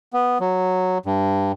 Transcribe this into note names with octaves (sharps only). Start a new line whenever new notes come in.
B3
F#3
G2